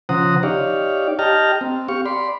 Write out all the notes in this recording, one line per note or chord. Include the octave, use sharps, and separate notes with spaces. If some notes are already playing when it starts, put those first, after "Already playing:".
C#3 F3 C5 F#5 A#5 D#6
D#4 G4 C#5 D5 F5
G4 D#5 G5 A5 A#5 F6
C4
G4 F5 C#6
D5 B5 C6